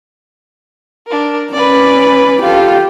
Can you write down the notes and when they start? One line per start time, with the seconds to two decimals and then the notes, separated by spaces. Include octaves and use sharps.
1.07 D4 A#4
1.53 C#4 B4 D5
2.42 F4 G4 A4